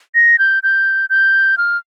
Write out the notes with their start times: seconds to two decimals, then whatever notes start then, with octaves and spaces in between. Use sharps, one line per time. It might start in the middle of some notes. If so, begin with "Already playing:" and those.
0.15 A#6
0.39 G6
0.63 G6
1.10 G6
1.58 F6